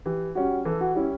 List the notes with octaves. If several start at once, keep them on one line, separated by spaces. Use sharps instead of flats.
E3 G4
G3 C#4 F#4
E3 A4
F#4
G3 C#4 E4